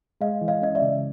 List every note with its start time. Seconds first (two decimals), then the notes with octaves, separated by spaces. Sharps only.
0.21 G#3 D#5 F5
0.41 E3
0.48 D#5 F5
0.62 C#4 D#5
0.75 D5 E5
0.82 C#3